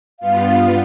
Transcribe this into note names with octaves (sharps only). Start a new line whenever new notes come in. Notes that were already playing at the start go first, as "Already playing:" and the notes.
G2 B3 F4 F5